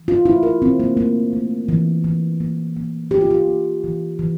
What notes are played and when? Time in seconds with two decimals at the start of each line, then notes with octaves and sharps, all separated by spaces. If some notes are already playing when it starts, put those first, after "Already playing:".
Already playing: E3
0.08 F4
0.25 A3 E4
0.43 A#4
0.62 E3 C4
0.80 A#3
0.97 A3 A#3
1.33 A3
1.68 E3
2.04 E3
2.40 A#3
2.76 A#3
3.11 E3 G4
3.21 F4
3.31 G4
3.47 A#3
3.84 E3
4.19 E3